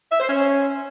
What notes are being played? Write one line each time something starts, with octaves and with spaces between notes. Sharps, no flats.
E5
C5
C#4